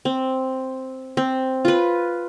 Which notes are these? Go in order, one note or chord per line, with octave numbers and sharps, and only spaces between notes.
C4
C4
F4 B4